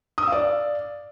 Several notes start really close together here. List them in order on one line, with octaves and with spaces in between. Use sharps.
D#6 E6 F5 D5